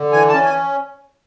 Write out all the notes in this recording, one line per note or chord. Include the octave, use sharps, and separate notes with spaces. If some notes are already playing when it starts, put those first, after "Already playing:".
Already playing: D3
E3 G#5
A5
C#4
G#5